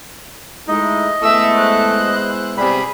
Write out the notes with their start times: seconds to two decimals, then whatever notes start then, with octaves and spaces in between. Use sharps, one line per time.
0.68 G#3 A3 D#4 E4 D#5
1.22 G#3 A3 B3 E4 E5 E6
1.55 C5 F#6
2.58 C3 G3 G#4 B5